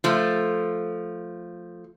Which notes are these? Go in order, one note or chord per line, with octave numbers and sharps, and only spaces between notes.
F3 A3